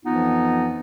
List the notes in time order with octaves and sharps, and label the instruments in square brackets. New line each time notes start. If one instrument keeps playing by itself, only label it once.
[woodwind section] F2 E3 F3 B3 D#4 F4